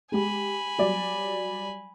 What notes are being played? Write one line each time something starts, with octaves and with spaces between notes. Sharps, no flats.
G#3 G4 G#5 B5
F#3 G3 D5